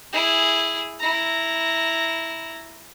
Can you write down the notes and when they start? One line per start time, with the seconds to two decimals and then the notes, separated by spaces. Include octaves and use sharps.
0.13 E4 G#4
1.00 E4 A#5